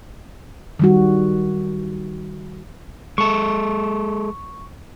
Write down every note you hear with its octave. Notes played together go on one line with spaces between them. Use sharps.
D#3 G3 F#4
G#3 A4 C#6